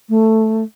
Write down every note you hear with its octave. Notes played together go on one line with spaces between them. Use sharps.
A3